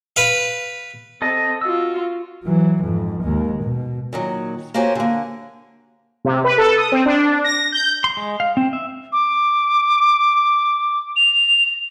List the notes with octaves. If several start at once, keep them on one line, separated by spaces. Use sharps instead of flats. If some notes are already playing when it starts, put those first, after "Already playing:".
B4 F5
C4 A4 D#5
F4 F#4 E6
E3 F#3
F2 G#2
D#2 G#3
B2
A#2 D#3 F#3
A#3 F#4 G4 C5 C#5 G#5
D3 A#3
C3
B4
A4
D#6
C4
D4
A#6
G6
C6
G#3
F5
C4
E5
D6
F7